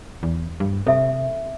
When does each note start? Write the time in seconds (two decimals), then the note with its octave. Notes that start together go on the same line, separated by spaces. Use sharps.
0.23 E2
0.60 G2
0.87 C3 A4 E5 C#6